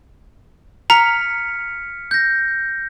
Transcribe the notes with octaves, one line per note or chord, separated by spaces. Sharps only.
A#5 F6 B6 C#7
G6 A#6